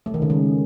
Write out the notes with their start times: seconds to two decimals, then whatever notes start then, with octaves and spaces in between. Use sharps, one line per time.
0.06 A3
0.14 D#3
0.22 C#3
0.30 G#3